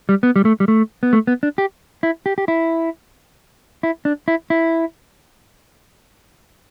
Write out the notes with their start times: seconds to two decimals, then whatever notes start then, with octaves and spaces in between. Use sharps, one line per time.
0.09 G3
0.23 B3
0.36 G3
0.45 A3
0.60 G3
0.68 A3
1.03 B3
1.13 A3
1.27 B3
1.43 D4
1.58 G4
2.03 E4
2.26 G4
2.38 G4
2.48 E4
3.83 E4
4.05 D4
4.28 E4
4.50 E4